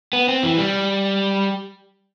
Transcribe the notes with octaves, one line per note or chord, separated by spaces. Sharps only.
B3
C4
E3
G3